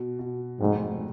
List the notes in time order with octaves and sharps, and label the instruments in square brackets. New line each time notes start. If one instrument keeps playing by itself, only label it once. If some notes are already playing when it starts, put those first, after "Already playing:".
Already playing: [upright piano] B2
B2
[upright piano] F1 [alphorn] G#2